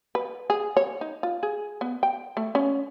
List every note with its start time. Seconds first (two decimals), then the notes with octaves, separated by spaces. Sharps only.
0.15 B4
0.50 G#4
0.77 C#5
1.01 D#4
1.23 F4
1.43 G#4
1.81 B3
2.03 G5
2.37 A3
2.55 C#4